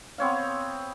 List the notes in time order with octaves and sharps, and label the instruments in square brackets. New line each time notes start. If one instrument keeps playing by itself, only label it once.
[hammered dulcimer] B3 C4 C#5 F5